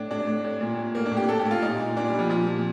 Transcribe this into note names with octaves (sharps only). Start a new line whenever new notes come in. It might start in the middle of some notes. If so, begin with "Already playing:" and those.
Already playing: A2 D4
A2 D4
A2
A2
A#2
A#2
A2 A#3
D4
A2
G4
A2 A4
G4
A2
F4
A#2 D#4
A#2
A#2 D4
G3
A#2
F3
A#2 F3
A#2